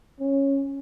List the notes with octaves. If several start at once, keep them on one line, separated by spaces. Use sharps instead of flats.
C#4